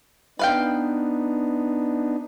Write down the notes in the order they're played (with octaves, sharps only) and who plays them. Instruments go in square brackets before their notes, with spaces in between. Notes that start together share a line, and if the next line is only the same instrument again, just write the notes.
[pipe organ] B3 D4 D#4 [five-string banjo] B4 F5 G5